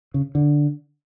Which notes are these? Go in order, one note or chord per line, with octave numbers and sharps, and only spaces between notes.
C#3
D3